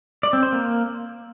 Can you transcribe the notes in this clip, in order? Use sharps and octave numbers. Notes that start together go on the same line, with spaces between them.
D5
C4
C5
A#3